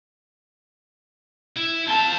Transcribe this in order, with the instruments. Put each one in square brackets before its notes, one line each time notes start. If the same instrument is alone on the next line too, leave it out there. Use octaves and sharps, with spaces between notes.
[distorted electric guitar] E4
[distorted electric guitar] C4 F5 [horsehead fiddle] A5